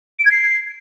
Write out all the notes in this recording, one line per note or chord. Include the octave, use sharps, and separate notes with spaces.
D7
G#6
C7